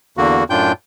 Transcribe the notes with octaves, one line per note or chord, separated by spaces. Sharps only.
E2 D3 A#3 F#4
F#2 A2 D4 F4 G5 G6